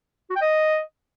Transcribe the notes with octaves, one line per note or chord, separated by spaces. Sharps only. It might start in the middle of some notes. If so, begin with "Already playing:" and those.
F#4
G5
D#5